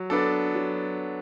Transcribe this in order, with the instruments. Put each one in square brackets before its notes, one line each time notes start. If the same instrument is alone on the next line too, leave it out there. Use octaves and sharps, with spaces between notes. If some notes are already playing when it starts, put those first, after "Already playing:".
Already playing: [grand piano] F#3
B3 D4 A4
F#3